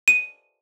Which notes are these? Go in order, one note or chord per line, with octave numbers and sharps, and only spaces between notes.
D#7